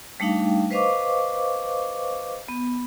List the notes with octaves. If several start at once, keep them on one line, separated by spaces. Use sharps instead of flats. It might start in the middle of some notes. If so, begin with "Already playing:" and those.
G3 A3 D4 D#4 F5 G5
B4 C5 D#5 F5 C#6 D6
B3